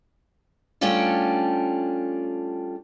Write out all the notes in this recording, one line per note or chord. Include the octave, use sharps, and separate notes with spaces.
G3 A3 C#4 D4 F4 G4